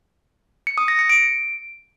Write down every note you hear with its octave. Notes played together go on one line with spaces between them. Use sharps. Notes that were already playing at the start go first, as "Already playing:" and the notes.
C#7
D#6
A#6
C#7
D7